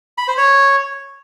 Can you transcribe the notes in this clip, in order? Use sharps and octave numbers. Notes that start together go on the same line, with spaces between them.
B5
C5
C#5